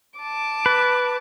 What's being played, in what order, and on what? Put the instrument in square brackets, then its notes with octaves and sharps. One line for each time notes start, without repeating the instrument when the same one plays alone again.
[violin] A5 D6
[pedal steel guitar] B4